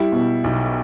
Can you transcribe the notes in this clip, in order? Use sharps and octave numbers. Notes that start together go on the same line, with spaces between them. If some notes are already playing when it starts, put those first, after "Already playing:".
Already playing: G3 E4
B2
B1